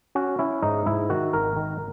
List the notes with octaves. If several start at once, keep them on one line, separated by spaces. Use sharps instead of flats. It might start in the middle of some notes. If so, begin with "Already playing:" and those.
C#4 F#4
C#4 E4
G#2 D#4
G#2 E4
D#3 F#4
G#1 A#4
D#3